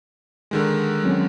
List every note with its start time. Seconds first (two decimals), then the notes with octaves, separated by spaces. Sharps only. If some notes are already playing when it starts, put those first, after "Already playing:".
0.51 D3 D#3 G#3
1.04 F#3 C4 C#4